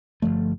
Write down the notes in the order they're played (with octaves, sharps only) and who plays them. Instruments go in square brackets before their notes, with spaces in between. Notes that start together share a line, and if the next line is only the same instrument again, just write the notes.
[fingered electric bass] G1 F2 F3 A3